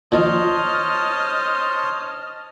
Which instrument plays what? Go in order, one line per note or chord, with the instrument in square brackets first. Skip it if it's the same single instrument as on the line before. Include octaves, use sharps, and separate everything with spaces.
[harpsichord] A#2 D#3 F3 [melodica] C5 C#5 A5 [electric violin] D#5 F6